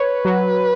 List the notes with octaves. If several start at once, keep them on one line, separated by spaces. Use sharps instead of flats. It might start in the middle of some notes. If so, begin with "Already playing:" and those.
Already playing: B4 C#5
F#3